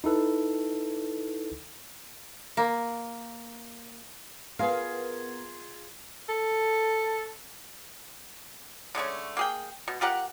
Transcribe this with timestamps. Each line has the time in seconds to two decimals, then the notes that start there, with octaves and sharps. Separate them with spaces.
0.04 D#4 E4 A4 B4
2.57 A#3
4.59 B3 F4 G#4 A#4 F5
6.29 A4
8.95 D3 G#3 A3 C#4
9.37 A#3 G#4 G5
9.88 B2
10.01 F4 G4 A#4 F#5